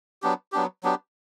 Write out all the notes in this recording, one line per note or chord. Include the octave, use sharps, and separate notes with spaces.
F#3 B3 D4 G4
F#3 B3 D4 G4
F#3 B3 D4 G4